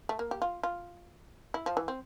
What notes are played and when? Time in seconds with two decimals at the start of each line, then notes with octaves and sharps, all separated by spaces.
0.09 A3
0.19 A#3
0.31 G4
0.42 F4
0.63 F4
1.54 E4
1.66 F3
1.77 E3
1.88 C4